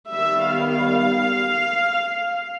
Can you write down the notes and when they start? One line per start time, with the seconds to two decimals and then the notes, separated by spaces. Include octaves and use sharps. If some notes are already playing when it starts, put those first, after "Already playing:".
0.11 D#3 G3 B3 E5
0.49 F5